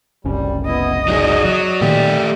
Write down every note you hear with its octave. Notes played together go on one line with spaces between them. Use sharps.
F#1 C2 G3 C#4
B3 E4 D#5
F#3 D#4 G#4 D5
F#3
A#2 D#3 A3 G4